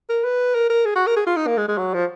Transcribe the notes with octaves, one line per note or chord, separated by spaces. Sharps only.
A#4
B4
A#4
A#4
G#4
F#4
A#4
G#4
F4
D#4
A#3
G#3
G#3
F#3
F3